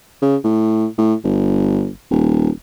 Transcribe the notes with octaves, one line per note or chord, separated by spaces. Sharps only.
C#3
A2
A2
G1
D#1